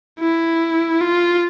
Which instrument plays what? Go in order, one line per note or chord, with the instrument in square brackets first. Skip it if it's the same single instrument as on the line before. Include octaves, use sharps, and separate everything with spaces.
[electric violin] E4
F4